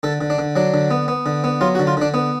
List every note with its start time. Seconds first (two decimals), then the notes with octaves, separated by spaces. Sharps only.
0.03 D3 A4
0.21 D3
0.30 D4
0.39 D3
0.56 F#3 D4
0.74 D3
0.91 B3
1.08 B3
1.26 D3
1.44 B3
1.61 F#3 F4
1.75 F#4
1.79 D3
1.87 F4
1.97 D3 D4
2.14 B3